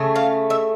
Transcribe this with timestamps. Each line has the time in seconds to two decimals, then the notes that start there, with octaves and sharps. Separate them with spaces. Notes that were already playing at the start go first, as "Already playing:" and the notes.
Already playing: C#3 A3
0.15 F5
0.50 E5